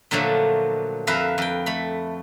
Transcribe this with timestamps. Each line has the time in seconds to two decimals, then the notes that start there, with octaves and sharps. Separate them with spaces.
0.11 A#2 D3 F3 F#3 A3
1.07 F2 B4 E5 F5 A#5
1.38 F2 G5
1.66 A3 B5